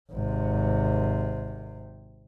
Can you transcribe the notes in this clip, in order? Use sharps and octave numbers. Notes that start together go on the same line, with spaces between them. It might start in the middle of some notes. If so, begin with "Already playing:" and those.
G#1 C3